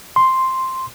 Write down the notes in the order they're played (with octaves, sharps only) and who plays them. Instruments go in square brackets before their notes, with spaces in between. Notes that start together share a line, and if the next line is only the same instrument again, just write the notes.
[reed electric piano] C6